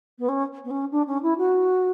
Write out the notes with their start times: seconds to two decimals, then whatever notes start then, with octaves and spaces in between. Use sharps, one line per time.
0.18 B3
0.28 C#4
0.64 B3
0.70 C#4
0.91 D4
1.07 C#4
1.22 E4
1.38 F#4